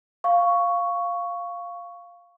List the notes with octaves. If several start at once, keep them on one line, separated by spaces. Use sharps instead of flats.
F5 C#6